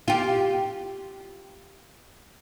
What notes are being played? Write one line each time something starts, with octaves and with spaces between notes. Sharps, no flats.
F4 G4